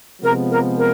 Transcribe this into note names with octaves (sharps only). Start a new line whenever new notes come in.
C3 F3 G#3 B3 A#4
A#4
A#4